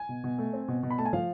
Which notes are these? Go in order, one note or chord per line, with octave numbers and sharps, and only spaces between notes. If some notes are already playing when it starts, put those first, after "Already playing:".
Already playing: G#5
B2
B2
A3
C4
B2
B2
B5
A3 A5
G#5
F3 F5